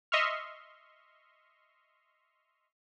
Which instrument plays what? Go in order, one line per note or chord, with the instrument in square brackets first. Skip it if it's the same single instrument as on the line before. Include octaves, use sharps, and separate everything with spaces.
[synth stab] D#5 E5 C6 C#6 F6